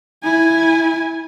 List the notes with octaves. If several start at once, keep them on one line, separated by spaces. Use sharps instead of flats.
E4 G#5